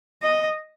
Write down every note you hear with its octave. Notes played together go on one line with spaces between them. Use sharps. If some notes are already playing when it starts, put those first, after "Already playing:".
D#5